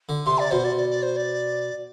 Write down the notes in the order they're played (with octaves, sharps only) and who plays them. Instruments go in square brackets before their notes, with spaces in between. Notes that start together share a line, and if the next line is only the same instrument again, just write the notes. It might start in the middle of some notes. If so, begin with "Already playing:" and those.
[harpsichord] D3
[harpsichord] C3 [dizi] C6
[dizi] D5
[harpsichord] B2 [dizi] C5
[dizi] D5
D5
D5
C5
D5